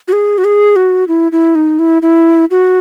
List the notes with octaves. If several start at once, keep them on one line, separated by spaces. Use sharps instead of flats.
F#4
G#4
F#4
G#4
F#4
E4
E4
D#4
E4
E4
F#4